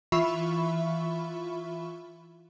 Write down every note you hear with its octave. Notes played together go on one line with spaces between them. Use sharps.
E3 F4 E5 B5 C#6